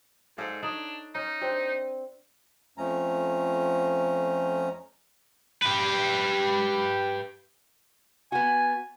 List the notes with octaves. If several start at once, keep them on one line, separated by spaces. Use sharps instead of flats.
G#2 A4 D5 F5
D4 D#4 C#5
C#4 D#4
C4 D4 G4
F2 F3 A3 C#4 A#5
G4 B4
B3 F#4 G#5